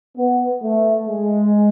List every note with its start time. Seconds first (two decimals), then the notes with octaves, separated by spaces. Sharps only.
0.17 B3
0.63 A3
1.09 G#3